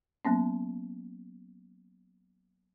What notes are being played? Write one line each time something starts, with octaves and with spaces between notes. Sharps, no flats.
F#3 A#3 B3 C#4